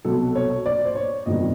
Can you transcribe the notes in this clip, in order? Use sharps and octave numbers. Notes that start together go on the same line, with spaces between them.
C2 B2 F#3 A4
C#5
D5
C5
C#5
G1 F2 C3 D#3 G3 D#5